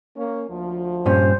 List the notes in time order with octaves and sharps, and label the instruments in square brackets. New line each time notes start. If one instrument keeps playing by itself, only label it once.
[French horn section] A#3 C#4
D2 F3
[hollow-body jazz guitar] G2 A#2 C#4 [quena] C5